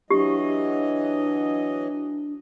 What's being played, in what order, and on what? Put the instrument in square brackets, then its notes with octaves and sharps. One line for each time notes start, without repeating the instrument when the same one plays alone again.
[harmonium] E3 F#3 D#5 [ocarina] D4 [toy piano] G4